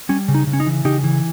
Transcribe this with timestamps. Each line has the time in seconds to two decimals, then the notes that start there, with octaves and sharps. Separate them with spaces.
0.09 G3 C#4
0.28 C#3
0.35 D#4
0.47 C#3
0.53 C#4
0.60 D#4
0.66 E3
0.85 C#3 D#4 G4
1.04 E3